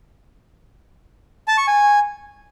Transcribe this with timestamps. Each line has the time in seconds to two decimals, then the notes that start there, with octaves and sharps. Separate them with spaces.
1.48 A5
1.58 C#6
1.67 G#5